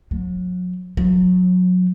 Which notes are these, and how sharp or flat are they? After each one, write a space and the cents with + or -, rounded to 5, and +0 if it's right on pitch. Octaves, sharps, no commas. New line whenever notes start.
F#3 -35
F#3 -25